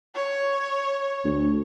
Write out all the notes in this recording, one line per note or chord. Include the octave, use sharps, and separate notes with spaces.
C#5
D2